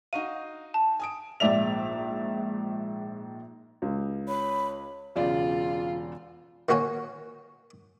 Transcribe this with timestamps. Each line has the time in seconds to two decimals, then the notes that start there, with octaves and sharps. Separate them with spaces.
0.13 D#4 F#4 F5 D#7
0.74 A5
1.00 G#5 D#6 D7
1.40 A#1 G#2 D5 E5 F7
3.82 C#2
4.28 C#5 B5
5.16 E1 C#3 F4 D5
6.69 D#3 A#3 F#4 C#5 G#5